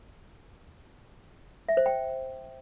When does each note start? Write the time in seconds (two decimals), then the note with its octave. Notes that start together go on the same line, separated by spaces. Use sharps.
1.69 E5
1.77 C5
1.86 G5